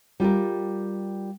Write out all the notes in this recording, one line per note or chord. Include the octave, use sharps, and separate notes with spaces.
G3 F4 G4 A#4